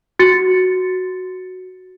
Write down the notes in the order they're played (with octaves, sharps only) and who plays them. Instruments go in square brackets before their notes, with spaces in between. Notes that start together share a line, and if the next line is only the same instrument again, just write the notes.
[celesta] F#4 A6 C#7